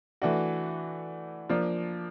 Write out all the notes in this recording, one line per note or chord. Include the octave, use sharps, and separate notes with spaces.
E3 A3 D4 F#4
F3 A#3 D4